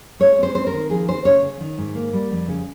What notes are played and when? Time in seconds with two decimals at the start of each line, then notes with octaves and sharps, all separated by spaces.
0.20 G#3 C#5
0.38 C4 C5
0.54 C4 C5
0.67 A#4
0.73 D#3
0.90 F3 G#4
1.08 C4 C5
1.25 C#3 C#5
1.42 C#3
1.60 D#3
1.78 G#2
1.95 A#3
2.13 G3
2.31 F2
2.48 C#3